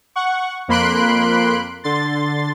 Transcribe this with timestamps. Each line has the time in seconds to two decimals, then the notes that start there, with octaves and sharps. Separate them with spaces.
0.16 F#5 C#6
0.68 F2 A#3 B5 C6 F#6 D7
1.84 D3 C6 A6